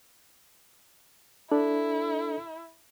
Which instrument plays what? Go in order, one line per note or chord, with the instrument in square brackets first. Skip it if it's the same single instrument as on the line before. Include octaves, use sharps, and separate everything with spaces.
[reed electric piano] D4 [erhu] E4 [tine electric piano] A4